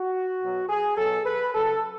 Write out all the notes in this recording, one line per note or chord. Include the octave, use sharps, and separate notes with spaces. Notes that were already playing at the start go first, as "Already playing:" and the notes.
Already playing: F#4
B2 F#3
G#4
B2 F#3 A4
B4
C#3 F#3 A4